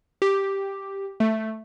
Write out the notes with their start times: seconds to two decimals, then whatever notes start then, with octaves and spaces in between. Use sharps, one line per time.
0.22 G4
1.20 A3